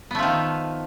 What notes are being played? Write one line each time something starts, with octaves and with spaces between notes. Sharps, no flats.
D#3 F3 A3 B3